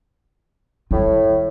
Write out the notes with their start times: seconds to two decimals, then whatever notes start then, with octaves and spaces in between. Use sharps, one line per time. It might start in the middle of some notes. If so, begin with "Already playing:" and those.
0.91 A2 D#3 G3